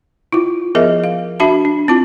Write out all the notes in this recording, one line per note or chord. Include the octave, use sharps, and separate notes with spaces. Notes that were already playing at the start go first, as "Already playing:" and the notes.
E4 F4
F3 B3 G#4 A#4 D#5 E5
F5
D4 F#4 E5 A5 B5
D4
C4 E4 F4 A5